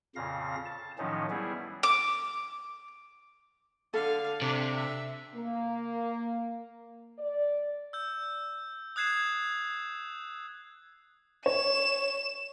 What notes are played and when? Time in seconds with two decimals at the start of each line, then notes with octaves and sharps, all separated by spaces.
0.16 F2 A#2 C#3 F5 A#6
0.65 A5
0.98 A2 D#3 F3 F#3 C#4 D#4
1.30 G3 B3 E4 G#4
1.83 D6
3.94 D3 A4 F5
4.42 C3 D4
4.76 E5
5.34 A#3
7.19 D5
7.93 E6 G6
8.96 D#6 F#6 G#6 C7 E7
11.46 C#5 E7